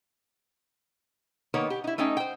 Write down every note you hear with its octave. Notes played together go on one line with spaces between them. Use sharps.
D#3 A#3 B3 C#5
G4
D#4 E4
A3 C#4 D#4 G5
C5 G5